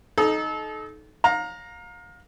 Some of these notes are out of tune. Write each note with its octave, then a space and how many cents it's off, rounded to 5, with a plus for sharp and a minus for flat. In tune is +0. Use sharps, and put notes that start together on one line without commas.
D#4 +0 A4 -30
F5 +30 A#5 +0